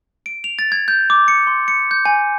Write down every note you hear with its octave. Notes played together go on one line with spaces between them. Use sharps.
D7
F7
A6
G#6
G6
D6
C#7
C6
C#7
G6
G#5